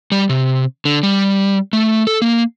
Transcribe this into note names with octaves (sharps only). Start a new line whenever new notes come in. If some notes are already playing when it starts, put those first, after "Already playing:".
G3
C3
D3
G3
A3
A4
A#3